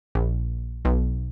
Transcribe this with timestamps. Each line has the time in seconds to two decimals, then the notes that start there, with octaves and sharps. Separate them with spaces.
0.15 A#1
0.85 B1